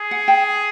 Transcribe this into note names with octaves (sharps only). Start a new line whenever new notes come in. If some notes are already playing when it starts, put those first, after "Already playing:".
Already playing: G#4
F#5 G#5
G5 A5